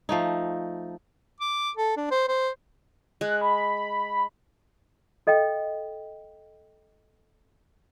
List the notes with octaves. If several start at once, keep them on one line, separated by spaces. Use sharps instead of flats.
F3 A3 D#4
D6
A4
D4
C5
C5
G#3 F#6
B5
A4 D#5 F5 G5